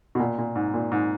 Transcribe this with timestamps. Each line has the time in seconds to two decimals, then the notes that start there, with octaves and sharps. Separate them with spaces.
0.15 B2
0.19 A#2
0.38 A#2
0.55 G#2
0.74 A#2
0.92 G#2